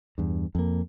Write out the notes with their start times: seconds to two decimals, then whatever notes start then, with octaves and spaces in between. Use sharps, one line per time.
0.18 E2 G2
0.55 F2 A#3